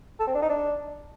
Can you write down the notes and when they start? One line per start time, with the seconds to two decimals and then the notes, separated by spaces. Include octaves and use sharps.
0.20 A4
0.27 C4
0.34 D4
0.42 D#4
0.49 D4